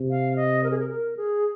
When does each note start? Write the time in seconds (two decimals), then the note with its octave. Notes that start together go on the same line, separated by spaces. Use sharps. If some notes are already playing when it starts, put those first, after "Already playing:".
Already playing: C3
0.10 F5
0.36 D#5
0.64 A#4
0.71 G#4
0.79 A#4
0.89 A#4
1.17 G#4